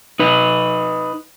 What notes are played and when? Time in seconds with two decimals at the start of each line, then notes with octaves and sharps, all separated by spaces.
0.19 D#4 B4